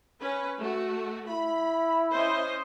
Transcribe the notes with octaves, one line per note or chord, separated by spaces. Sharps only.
C#4 B4
A3 F#4
E4 B5
C#4 C5 D#5